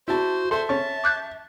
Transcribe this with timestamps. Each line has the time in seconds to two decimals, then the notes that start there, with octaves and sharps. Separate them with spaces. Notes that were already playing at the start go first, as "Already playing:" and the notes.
0.08 E4 F#4 C5 A5
0.51 A4 C5 E5 C6
0.69 C#4 A5 C#6
1.04 D6 F#6 G6